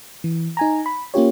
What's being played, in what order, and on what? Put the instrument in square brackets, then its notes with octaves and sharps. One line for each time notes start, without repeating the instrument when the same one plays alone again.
[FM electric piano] E3
D#4 G#5 A#5
B5
A#3 C#4 F4 G4 C#5